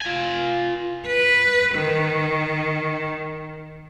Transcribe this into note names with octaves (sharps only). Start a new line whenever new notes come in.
F4 G#5
B4
D#3